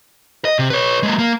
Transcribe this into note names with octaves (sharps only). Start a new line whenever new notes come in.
D#5
C3
B4 C#5
G#3 A#3
A#3